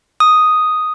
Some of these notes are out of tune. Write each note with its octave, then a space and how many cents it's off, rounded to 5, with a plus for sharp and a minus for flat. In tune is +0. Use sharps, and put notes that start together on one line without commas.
D#6 +0